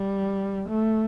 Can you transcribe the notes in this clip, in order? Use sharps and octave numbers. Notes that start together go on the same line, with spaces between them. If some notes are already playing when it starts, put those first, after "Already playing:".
Already playing: G3
A3